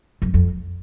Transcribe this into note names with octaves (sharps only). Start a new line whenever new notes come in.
F#2
F2